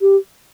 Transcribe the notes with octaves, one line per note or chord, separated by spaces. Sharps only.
G4